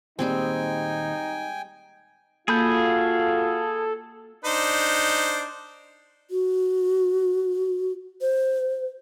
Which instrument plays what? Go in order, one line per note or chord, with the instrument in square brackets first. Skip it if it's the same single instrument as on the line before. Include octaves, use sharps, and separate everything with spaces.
[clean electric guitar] D#2 A#2 [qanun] G3 G#3 C4 [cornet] D#4 [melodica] G5 G#5
[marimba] A#3 [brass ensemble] F4 F#4 F5 [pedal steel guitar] G#4 B5 G6 [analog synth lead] A4
[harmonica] D4 D#4 C5
[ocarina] F#4
C5